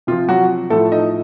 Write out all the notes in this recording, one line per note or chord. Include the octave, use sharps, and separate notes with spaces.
C3 F3 F4
F#3 F#4
A2 F3 A3 A4
D#4 D#5